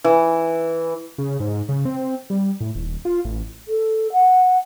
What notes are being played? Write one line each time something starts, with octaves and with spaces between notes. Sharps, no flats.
E3
C#3
G#2
C#3
C4
G3
A2
D#1
F4
A1
A4
F#5